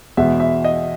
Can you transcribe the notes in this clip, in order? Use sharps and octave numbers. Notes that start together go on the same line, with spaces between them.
E2 B2 G#3 E5
E5
D#5